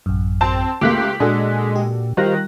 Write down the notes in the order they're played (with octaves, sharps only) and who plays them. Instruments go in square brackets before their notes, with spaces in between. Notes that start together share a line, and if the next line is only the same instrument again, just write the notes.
[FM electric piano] A1 F#2
[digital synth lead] C4 [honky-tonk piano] A5
[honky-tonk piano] C#2 A3 A#3 [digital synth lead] G4 [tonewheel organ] C6 [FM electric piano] D6 F#6 B6
[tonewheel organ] A#2 [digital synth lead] G#3 [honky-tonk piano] D4 F#4 A4
[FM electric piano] G4
[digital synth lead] D#3 [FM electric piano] G3 F#6 A#6 [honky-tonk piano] F4 [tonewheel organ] G4 C5 F5